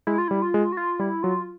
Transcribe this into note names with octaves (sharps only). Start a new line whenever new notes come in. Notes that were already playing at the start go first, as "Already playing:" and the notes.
G#3 E4
F4
G3 E4
F4
G#3
F#4
F4
G3 E4
F#3 F4